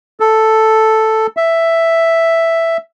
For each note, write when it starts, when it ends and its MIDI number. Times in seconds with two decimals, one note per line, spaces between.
0.20 1.27 69
1.37 2.77 76